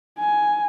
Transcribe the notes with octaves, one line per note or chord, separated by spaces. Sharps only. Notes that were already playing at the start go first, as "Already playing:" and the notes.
G#5